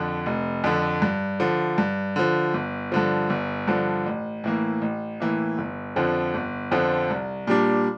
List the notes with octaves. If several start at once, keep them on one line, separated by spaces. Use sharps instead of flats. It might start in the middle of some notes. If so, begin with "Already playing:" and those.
Already playing: F2 D3
F1
F2 D3
G2
D3 F3
G2
D3 F3
G1
G2 D3 F3
G1
G2 D3 F3
A1
A2 E3 A#3
A1
A2 E3 A#3
G1
F2 D3 F3 C4
G1
F2 D3 F3 C4
C2
A#2 G3 D4